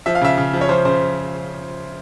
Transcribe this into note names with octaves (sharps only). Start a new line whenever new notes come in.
F3 E5
F5
C#3 E5
C#3
F3
C#5
F3 C5
C#3 C5